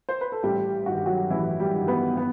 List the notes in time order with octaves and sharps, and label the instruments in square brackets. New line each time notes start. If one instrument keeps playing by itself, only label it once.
[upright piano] C5
B4
A4
A1 G3 G4
G2 D#3 F#4
G4
F#3 F#4
A1 E3 E4
G3 G4
G2 D#3
B3 B4
B3